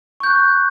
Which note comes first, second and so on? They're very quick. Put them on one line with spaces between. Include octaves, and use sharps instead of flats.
C#6 G6 F#6